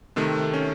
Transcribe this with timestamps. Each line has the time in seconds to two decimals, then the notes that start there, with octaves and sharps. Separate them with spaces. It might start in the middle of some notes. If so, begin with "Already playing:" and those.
0.16 C3 D#3 A3 C4
0.54 C#4